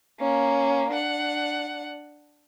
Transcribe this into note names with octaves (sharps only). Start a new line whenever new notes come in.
A#3 C#4
D4 F#5